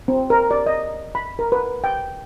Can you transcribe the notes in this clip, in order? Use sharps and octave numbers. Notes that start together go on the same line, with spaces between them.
C4
A#4
D5
D#5
B5
A#4
B4
G5